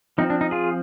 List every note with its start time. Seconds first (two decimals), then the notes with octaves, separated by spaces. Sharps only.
0.18 F3 C4 D#4
0.30 D4
0.41 D#4
0.51 F4 G#4